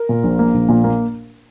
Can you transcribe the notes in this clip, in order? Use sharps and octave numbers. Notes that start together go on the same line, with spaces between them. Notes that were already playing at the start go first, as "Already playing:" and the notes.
Already playing: A#4
A#2
A#1
A#3
A#1
A#2
A#3